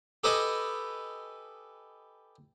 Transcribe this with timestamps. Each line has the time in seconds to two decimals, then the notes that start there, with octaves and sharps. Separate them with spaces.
0.24 G4 A4 B4 D#5 G#5